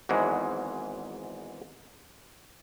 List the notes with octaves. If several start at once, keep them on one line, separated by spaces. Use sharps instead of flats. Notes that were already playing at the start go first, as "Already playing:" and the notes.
G#1 E2 G#2 E3 F#3 G#3